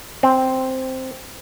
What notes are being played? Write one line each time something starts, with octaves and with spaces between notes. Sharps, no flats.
C4